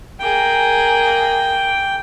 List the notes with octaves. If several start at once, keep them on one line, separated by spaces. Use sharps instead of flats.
A#3 G#4 G5